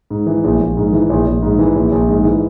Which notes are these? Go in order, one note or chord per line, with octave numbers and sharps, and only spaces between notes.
G#2
E3
A#1
A#1
G#2
E3
A#1
A#1
G#2
E3
A#1
A#1
G#2
E3